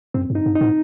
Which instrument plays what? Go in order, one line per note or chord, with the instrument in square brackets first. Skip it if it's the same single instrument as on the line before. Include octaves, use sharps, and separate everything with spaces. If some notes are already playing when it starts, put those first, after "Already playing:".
[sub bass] F#2 [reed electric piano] C4
[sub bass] G2
[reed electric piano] D#4
[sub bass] G2
[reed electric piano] D#4
[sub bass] A2